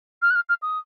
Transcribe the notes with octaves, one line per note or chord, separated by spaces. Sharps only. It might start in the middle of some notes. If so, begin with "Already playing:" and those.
F6
F#6
F6
F6
D#6